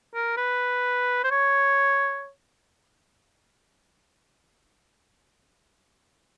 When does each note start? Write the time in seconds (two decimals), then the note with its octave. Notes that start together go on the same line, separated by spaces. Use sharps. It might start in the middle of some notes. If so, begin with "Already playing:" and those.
0.14 A#4
0.37 B4
1.24 C5
1.31 C#5